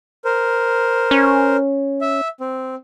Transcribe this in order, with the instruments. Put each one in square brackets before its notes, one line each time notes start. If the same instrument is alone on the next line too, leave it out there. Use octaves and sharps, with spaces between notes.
[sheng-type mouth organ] A#4 C5
[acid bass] C#4
[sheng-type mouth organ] E5
C4